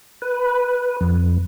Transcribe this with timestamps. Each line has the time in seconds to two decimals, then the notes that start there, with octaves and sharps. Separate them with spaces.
0.22 B4
1.01 F2